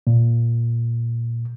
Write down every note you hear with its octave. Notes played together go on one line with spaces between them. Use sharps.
A#2